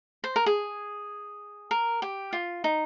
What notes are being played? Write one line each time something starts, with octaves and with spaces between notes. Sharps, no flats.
C5
A#4
G#4
A#4
G4
F4
D#4